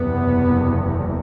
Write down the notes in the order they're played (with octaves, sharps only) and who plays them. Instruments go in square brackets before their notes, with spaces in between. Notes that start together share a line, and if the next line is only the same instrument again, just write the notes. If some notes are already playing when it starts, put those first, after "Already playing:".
Already playing: [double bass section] F#1 E2 C3 B3